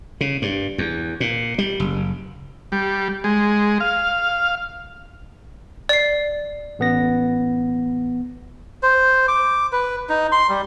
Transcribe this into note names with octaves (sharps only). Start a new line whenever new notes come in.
C#3
G2
E2
A#2
G3
F#1
G3
G#3
F5
D5 C7
A1 B3 A#6
C5
D6
B4
D#4
C6
G3